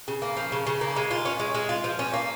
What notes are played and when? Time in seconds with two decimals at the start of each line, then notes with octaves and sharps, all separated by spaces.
0.08 C#3
0.22 A#3
0.37 F3
0.52 C#3
0.67 C#3
0.81 A#3
0.96 G#3
1.11 F4
1.25 C#4
1.40 G#3
1.55 G#3
1.69 F4
1.84 F3
1.99 C#4
2.13 A#3